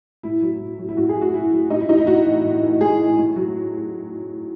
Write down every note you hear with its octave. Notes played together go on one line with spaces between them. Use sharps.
A2 E4
F#3
A2
F#3
E4
A2 F#4
G#4
F#3
F#4
A2 E4
F#3
A2 D#4
E4
E3 D#4
E4
A2 F#4
E3
A2
E3
A2 G#4
E3
A2
F#3